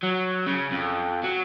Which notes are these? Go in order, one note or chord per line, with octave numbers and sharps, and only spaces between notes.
F#3
C#3
F2
F#3